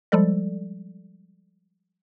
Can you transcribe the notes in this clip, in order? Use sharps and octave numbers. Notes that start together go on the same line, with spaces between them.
F3 G3 G#3 A4 D5